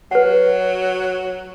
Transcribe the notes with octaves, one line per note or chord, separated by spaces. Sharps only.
F#3 B4 F#5